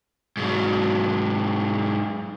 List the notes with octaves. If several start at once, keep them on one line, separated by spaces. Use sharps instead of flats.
G#2 F#3